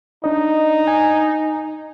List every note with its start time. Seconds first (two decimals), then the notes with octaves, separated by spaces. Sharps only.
0.24 D4 D#4 D#5
0.87 G#5